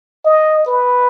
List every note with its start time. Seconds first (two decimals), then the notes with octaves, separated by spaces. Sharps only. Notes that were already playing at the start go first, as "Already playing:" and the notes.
0.25 D#5
0.66 B4